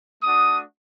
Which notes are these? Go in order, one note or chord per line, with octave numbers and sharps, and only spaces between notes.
A3 D4 F#4 D#6